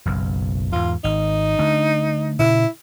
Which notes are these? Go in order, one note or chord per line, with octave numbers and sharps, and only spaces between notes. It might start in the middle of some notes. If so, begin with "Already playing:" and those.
F#1 B1 F#2
E2 G#2 F4
G#1 D#4
D3 A3 D4
A#2 C#3 E4